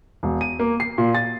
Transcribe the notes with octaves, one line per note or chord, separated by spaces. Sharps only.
E1
D#7
A#3
C7
A#2
A6